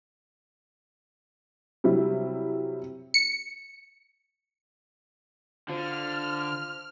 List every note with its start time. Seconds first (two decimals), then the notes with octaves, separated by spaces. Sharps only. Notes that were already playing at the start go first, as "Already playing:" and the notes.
1.84 C3 F#3 G3 E4
3.14 C#7
5.69 D3 F4 C5 F6